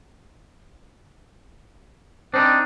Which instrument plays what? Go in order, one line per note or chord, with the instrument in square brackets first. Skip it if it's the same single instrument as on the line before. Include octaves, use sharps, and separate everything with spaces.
[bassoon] C4 [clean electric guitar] D4 D#4